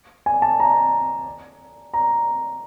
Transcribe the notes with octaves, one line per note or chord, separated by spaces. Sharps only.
G#5
A5
A#5
A#5